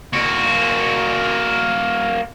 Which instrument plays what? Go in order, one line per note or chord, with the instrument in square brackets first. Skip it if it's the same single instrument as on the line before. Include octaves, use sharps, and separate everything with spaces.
[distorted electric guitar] A#3 F#4